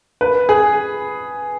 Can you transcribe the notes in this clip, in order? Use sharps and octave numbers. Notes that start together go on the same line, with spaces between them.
B4
G#4